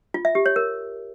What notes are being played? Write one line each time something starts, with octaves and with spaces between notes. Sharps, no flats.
F4
E5
G4
C#5
A#4